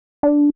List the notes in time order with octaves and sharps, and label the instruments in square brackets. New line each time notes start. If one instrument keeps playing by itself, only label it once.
[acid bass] D4